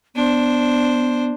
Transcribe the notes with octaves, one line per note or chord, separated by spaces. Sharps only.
B3 D4 C5